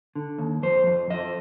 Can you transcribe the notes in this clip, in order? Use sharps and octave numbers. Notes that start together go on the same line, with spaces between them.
D3
D#2
F2 C5
F2
F2 D#5